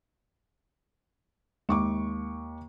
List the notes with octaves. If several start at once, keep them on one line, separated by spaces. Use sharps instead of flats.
D#2 G#3 C#6 D6